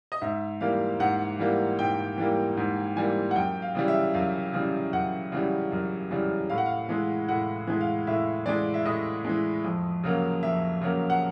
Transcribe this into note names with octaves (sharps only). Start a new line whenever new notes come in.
D#5
G#2 E5
E3 G3 A#3 F5
G#2 F#5
E3 G3 A#3
G#2 G5
E3 G3 A#3
G#2
E3 G3 A#3 G#5
F#5
F#2 G5
F5
C#3 E3 G3
E5
F#2 F5
C#3 E3 G3
F#2 F#5
C#3 E3 G3
F#2
C#3 E3 G3
A2 F5
F#5
F5
E3 G#3
A2 F#5
E3 G#3
F5
A2 E5
E3 G#3 D5
E5
A2 D#5
E3 G#3
F2
C#3 F#3 A#3
F2 E5
C#3 F#3 A#3
F#5